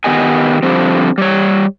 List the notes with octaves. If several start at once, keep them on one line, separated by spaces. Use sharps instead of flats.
D#3 B3 G4 D#5 G#5
D3 F3 G3 C4
G3 C#5